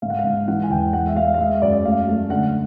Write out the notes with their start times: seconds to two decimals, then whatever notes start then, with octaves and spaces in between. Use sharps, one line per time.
0.02 G#2 F5
0.10 F#5
0.19 F5
0.24 G#2
0.48 E3 F#5
0.63 G#5
0.70 E2 G5
0.93 G#3 F#5
1.07 E5
1.16 G#3 F5
1.34 F5
1.39 G#3 E5
1.62 F#2 D5
1.84 A3 F5
2.08 A3
2.30 D3 F#5